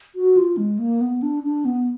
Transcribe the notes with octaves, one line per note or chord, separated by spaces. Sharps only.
F#4
F4
G#3
A#3
B3
D4
D4
B3